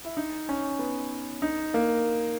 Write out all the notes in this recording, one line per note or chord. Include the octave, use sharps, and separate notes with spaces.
E4
D#4
C#4
B3
D#4
A#3